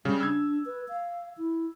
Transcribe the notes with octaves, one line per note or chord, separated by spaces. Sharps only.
C#3 G3 G#3
D4 E6 G#6
B4
F5
E4